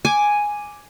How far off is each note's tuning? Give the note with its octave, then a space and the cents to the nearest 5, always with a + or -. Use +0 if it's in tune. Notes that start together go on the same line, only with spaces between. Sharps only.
G#5 +0 D6 +0